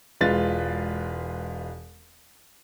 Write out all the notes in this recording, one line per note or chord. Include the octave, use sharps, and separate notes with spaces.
E1 G#3 F4 B4 A6